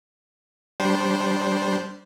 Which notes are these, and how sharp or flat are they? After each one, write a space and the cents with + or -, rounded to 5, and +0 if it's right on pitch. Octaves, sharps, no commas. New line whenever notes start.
G3 -15 D4 -10 C5 +0